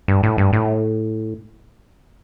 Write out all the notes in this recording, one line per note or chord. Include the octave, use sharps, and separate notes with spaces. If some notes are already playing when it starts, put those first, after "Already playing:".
G2
A2
G2
A2